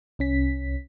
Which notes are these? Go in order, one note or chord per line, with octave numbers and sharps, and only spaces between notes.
C2 C#4 B6